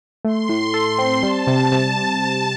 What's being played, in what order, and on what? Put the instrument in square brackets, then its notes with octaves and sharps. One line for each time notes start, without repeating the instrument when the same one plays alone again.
[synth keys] A3 [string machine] C6
[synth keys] A2
A4
C4
[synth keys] G3 [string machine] A5
[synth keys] C3
C3